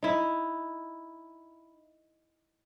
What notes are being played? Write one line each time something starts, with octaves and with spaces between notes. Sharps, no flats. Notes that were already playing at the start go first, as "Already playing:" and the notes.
D#4 E4